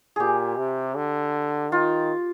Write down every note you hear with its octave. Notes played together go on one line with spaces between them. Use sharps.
A#2 G4 G#4
C3
D3
D#3 F4